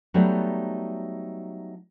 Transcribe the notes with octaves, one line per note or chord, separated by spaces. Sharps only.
F#3 G3 A3 B3 D#4